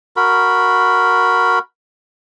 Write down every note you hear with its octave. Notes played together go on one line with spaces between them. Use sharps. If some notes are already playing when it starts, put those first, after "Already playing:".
F#4 A#4 B5